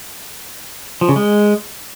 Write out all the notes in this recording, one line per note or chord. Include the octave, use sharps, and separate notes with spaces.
F3
C#3
G#3